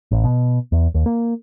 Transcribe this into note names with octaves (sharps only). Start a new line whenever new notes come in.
A1
B2
E2
D#2
A#3